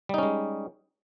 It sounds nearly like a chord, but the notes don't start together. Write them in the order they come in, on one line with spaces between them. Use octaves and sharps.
G3 D#4 C#4 G#3